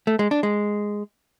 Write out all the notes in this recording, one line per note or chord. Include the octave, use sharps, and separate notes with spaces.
A3
G#3
D4
G#3